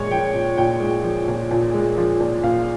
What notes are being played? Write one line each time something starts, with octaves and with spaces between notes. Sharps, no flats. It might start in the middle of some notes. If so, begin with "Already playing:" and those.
Already playing: A#2 G#3 C#5
F3 G5
A#2
A#2 G5
G#3
F3
A#2
A#2
G#3
F3
A#2
A#2 F5